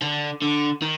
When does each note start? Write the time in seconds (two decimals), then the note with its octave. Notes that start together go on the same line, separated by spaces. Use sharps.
0.02 D3
0.42 D3
0.82 D#3